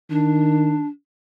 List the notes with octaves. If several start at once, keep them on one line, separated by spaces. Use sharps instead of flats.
D#3 D4